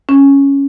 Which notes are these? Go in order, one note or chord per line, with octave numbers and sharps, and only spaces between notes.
C#4